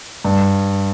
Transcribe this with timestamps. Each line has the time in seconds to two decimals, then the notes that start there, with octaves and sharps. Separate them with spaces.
0.25 G2